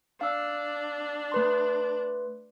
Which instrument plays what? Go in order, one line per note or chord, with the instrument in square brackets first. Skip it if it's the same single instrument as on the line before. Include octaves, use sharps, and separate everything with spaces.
[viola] D4 [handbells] F5 E6
[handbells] A3 B4 C6